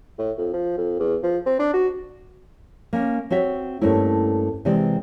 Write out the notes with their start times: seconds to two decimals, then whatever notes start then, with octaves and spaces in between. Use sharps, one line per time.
0.19 A2
0.38 F2
0.54 F3
0.78 F2
1.00 E2
1.23 F3
1.46 C4
1.59 D4
1.74 F#4
2.93 A#3 C#4
3.30 C4 F#4 C#5 E5
3.81 G2 A3 A#3 C4 C#4 E4
4.65 C3 E3 G#3 C4 D5